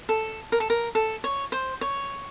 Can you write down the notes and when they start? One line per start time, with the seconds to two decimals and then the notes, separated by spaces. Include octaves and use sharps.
0.09 A4
0.52 A#4
0.60 A4
0.70 A#4
0.95 A4
1.24 C#5
1.52 C5
1.81 C#5